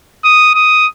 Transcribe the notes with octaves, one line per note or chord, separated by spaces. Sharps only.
D#6
D#6